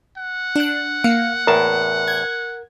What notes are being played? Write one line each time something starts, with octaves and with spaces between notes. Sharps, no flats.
F#5
D4 F#6
A#3 F5 F6 C#7
E2 A2 A#4 A5
G#6